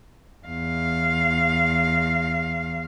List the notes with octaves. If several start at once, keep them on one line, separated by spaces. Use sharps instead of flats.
E2 F5